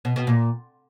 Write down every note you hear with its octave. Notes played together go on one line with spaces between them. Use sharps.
B2
B2
A#2